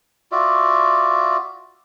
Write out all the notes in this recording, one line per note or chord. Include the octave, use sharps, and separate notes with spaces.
F4 F#4 D5 E5